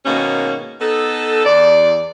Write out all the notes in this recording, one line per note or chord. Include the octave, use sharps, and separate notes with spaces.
G#2 B2 D#3 A#3 C#4
B3 D#4 A4
E2 D5